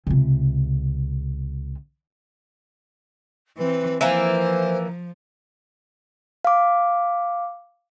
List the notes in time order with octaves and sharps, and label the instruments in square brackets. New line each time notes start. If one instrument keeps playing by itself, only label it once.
[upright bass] C#2 C3
[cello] E3 C4 [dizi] B4
[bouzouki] E3 A#3 [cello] F3 [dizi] C5
[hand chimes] F5 D6